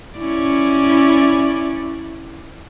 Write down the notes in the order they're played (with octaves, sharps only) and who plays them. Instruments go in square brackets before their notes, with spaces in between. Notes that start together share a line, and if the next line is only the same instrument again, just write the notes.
[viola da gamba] C#4 E4 D5